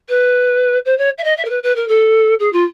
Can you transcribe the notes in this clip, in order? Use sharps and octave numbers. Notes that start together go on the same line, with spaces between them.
B4
C5
C#5
E5
D#5
E5
A#4
B4
B4
A#4
A4
G#4
F4